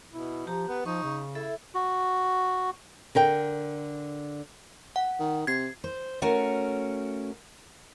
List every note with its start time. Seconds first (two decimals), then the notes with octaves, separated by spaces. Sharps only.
0.12 B2 E4
0.47 F3 G4 A#5
0.68 B3 B4
0.86 F3 D#4 C#6
1.03 C#3
1.35 E4 A4 E5
1.75 F#4
3.15 D3 A#4 G5
4.96 F#5
5.20 D#3
5.47 C3 G#6 C7
5.84 C5
6.22 A3 C#4 F#4 A#4